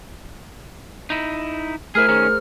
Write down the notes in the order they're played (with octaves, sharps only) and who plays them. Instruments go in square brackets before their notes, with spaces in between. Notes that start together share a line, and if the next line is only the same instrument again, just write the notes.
[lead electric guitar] D#4 E4
[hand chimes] A3 A#4 C5 [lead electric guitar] E4 G#4 [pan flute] F6
[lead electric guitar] D#3 C#4 [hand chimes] G#4 C5